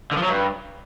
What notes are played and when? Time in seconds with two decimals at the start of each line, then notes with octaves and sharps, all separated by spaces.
0.11 D3
0.17 F3
0.23 F#3
0.29 G2